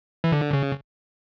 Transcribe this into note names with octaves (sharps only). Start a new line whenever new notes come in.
E3
D3
C#3